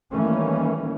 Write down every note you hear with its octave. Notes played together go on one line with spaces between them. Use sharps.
D#3 E3 G3 A3 A#3 C#4